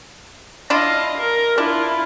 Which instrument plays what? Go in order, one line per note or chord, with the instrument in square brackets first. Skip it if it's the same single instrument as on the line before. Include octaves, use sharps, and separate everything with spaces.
[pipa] D4 E4 F4 [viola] D#5 F5
[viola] A#4
[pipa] D4 [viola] E4 F4